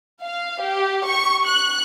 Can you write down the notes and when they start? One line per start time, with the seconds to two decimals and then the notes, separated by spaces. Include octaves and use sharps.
0.23 F5
0.61 G4
1.06 C#6
1.47 F#6